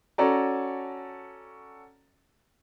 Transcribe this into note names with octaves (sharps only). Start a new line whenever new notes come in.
C#4 F#4 A4 D5 A5 A#5